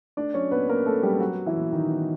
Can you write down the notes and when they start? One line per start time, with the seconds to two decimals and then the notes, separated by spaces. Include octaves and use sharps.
0.17 A3 D4 D5
0.34 F#3 C#4 C#5
0.51 A#2 B3 B4
0.69 A#3 C4 A#4
0.86 A3 A4
1.03 F#3 G3 G4
1.20 F#3 B3 F#4
1.38 G3
1.46 E3 E4
1.56 A#2
1.72 A#2 D#3 D#4
1.90 B3